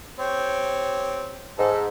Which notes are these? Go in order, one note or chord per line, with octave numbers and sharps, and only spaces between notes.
C4 G4 C#5
G#2 A4